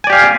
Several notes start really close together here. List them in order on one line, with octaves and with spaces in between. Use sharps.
G#5 D5 G4 F5